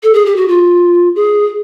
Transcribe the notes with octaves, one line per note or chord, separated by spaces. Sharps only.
A4
G#4
G4
F#4
F4
G#4